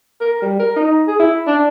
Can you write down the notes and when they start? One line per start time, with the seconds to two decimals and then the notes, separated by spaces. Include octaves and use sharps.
0.21 A#4
0.42 G3
0.59 A#4
0.76 D#4
1.08 G#4
1.19 E4
1.47 D4